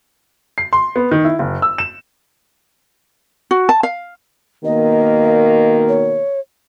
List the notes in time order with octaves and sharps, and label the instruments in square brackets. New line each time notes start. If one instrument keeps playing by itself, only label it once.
[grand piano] C7
C6
B3
D#3
E4
F#1
E6
E7
[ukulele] F#4
A5
F5
[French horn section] B2 D#3 A#3 [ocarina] D#5
[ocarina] C#5